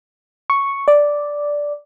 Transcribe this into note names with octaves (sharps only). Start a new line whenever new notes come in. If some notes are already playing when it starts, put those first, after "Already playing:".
C#6
D5